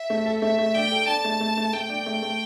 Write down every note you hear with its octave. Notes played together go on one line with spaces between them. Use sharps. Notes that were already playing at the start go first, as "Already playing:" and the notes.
Already playing: E5
A3
A4
A3 E5
A3
D4 G5
A4
D4 A5
A3
A3
A3
A3 G5
D4
A3
A3